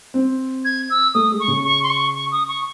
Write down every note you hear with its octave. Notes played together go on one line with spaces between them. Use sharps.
C4
G#6
E6
A3 D#6
G#3
C#6
C#3
C#6
C6
C#6
C#6
D#6
C#6